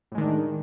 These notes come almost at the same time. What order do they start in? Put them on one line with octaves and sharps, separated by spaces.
A2 G#3 D#3 D4